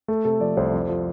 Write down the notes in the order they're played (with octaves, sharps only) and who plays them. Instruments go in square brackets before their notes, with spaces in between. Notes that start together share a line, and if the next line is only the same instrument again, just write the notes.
[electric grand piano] A3 [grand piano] A4
[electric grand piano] C3 [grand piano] A4
[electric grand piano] F3 [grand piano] D5
[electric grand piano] C2 [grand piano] C5
[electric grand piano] F2
F3